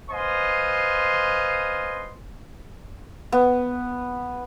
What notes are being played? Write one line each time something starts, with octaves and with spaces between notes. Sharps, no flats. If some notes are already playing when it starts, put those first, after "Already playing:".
B4 C5 D#5 F5 G#5 C6
B3